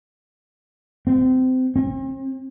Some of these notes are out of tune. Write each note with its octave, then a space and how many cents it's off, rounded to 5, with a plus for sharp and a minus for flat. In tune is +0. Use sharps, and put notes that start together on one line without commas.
C4 -25
C4 +40